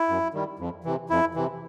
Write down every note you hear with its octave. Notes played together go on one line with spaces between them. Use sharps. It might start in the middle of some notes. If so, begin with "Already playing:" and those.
Already playing: E4
F#2
D#3 G3
F2
C3 E3
F2 E4
C3 E3